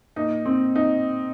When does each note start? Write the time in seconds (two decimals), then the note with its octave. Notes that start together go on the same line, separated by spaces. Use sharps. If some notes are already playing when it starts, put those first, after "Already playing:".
0.16 A#2 A#3 D#4
0.45 C4
0.75 D#4